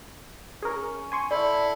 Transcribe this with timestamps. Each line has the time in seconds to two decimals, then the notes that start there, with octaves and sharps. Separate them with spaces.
0.62 C#4 G#4 A#4
1.12 G#5 C6 C#6
1.31 E4 A4 D5 B5